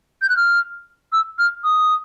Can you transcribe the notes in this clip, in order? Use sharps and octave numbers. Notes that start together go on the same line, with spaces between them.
G6
F#6
F6
E6
F6
D#6